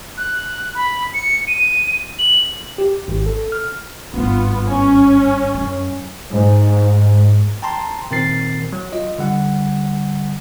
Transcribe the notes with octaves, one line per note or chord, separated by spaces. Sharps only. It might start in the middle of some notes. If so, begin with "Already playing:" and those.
F#6
B5
C#7
D#7
F#7
G4
G#1
A4
F6
G#1 G2 B3 F4
C#4
F#2
G#2
G5 A5 A#5 C6
A#2 D#3 C4 A#4 A6 C7
F#3
F4 D#5
D3 G3 F#5